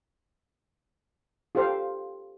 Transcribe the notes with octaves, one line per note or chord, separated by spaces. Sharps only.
F4 G4 A4 C5 F5